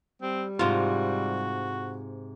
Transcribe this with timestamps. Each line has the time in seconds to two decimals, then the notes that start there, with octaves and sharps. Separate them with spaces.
0.22 G3 C4
0.59 G#2 C3 F4 F#4